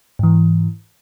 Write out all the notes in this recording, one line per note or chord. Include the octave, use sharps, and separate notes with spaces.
G#2 E3